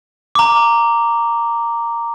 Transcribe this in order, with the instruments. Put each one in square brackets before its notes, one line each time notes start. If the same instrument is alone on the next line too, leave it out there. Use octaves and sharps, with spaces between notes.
[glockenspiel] A#5 D6